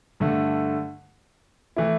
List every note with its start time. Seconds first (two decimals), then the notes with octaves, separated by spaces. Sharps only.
0.20 G2 D3 A3
1.76 E3 A3 E4